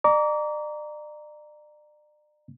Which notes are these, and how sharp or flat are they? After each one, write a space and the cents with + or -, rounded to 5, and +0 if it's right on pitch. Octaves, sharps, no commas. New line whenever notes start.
D5 +35 A#5 +0 D6 -35